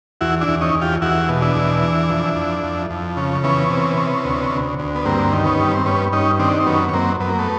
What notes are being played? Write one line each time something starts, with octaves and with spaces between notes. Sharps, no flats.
E2 E4 F#4
D4 E4
E2
C#4 D#4
E2
F4 G4
E2 E4 F#4
B2
D4 E4
E2
E3
F2
F2
F2
F2
C#3
E3 B3 C#4
C3
C3
D2
D2
D2
B3
G2 A#3 C4
D#3
B3 C#4
G2
C4
G2 B3 C#4
G2 C#4 D#4
D#3 C4 D4
C4
F#2 B3 C#4
C#4
F#2 A#3 C4
F#2 B3
A#3
A3 B3